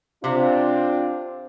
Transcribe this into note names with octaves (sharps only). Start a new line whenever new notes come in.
C3 C4 D4 F4